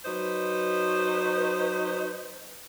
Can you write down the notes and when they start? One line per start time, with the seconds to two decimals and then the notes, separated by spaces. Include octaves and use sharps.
0.04 F#3 D#4 B4 C5